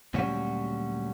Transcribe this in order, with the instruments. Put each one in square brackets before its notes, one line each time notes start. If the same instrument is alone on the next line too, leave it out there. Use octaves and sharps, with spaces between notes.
[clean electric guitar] D2 A#2 F#3 G3 C#4 F#4